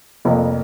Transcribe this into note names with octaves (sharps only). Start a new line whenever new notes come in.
F1 F2 F3 A#3